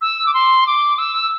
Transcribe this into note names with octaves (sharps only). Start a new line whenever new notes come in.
E6
D6
C6
D6
E6